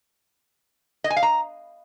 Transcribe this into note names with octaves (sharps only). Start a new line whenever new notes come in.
D#5
G#5
F5
A#5